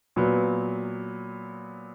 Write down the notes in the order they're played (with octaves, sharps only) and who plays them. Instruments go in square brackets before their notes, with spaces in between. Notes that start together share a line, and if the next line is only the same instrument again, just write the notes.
[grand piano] A#2 F#3 B3